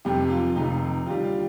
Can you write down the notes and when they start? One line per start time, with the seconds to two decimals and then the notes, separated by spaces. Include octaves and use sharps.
0.05 F1 F2 C3 G4
0.30 F4
0.56 F1 F2 C3 D#4
1.06 D#2 D3 G3 F4
1.24 F4